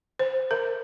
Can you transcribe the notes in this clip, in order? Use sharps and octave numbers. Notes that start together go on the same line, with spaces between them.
C5
A#4